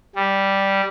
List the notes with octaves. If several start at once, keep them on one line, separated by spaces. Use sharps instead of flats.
G3